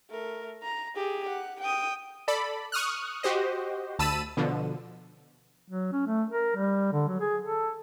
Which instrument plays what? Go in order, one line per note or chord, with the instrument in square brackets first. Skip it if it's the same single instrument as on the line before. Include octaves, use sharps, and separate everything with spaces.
[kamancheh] A3 A#4
A#5
G4 G#4
F#5
G5 D#6
[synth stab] A4 D5 B5
C#6 D#6 F6 F#6
F#4 G4 C5 D#5
D2 A5 B5 E6 D#7
B2 D3 F3
[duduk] F#3
C#4
A3
A#4
G3
D3
F#3
G#4
A4